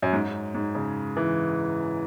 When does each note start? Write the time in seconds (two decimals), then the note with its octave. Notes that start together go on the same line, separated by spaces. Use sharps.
0.02 F#2
0.13 G#2
0.55 G#2
0.75 C#3
1.17 E3